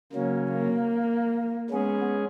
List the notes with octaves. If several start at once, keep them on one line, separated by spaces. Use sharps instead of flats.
C#3 F#3 A#3 C#4
A#3
G#3 B3 C#4 G#4